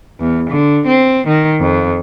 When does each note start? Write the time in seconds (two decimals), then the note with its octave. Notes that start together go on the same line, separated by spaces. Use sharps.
0.20 E2
0.50 D3
0.87 C4
1.27 D#3
1.60 F2